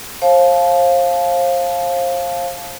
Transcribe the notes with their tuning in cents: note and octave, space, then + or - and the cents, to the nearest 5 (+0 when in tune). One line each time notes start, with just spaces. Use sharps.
C5 +35 F5 +0 A5 -25